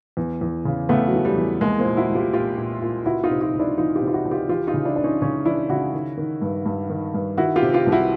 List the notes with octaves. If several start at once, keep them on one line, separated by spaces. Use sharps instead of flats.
E2
E2
C#3
C#3 A3 B3
F#3
E3
G3
E2
C2 G#3 A#3
A#3 C4
A#2
E4 F#4
C2
F4 G4
A#2 F4 G4
A#2
A#2
C#2 E4 F#4
D#4 F4
C3
D#4 F4
C#2
D4 E4
E3 D#4 F4
F4 G4
C3
F4
E4 F#4
C#2
F4 G4
E3 F4 G4
D#4 F4
C#3
D4 E4
C#2 D4
C#4 D#4
C#3 C#4 D#4
E3 D4 E4
C#3 E4 F#4
D#3
D#3
G2
G2
D#3
G2
D#3 E4 F#4
F4 G4
C3
F4 G4
C2
E4 F#4